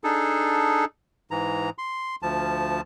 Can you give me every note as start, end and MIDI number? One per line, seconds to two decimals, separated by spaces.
0.04 0.85 62
0.04 0.85 63
0.04 0.85 68
0.04 0.85 69
1.31 1.70 44
1.31 1.70 52
1.31 1.70 82
1.78 2.16 84
2.23 2.81 38
2.23 2.81 53
2.23 2.81 81